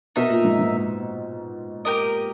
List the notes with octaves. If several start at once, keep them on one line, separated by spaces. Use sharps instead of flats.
B2 D#4 A#4 E5
A#2
G#2
G#2
G4 A#4 D#5